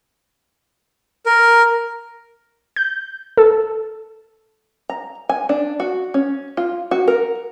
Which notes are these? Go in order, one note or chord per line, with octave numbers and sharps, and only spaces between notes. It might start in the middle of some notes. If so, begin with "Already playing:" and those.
A#4
G6
A4
A#5
G#5
D4
F#4
C#4
F4
F#4
A#4